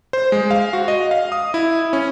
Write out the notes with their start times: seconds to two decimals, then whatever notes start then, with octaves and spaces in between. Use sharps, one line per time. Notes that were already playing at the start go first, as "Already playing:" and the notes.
0.13 C5
0.32 G#3
0.51 F5
0.73 F#4
0.88 D#5
1.11 F5
1.32 D#6
1.54 E4
1.93 C#4